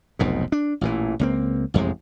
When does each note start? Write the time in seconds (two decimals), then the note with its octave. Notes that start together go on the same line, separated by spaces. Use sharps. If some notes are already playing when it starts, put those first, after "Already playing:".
0.19 F1 B1 F2 G#2
0.52 D4
0.81 A1 A#2 E3
1.19 C#2 A#3 C4
1.74 A1 F2 C3 G#3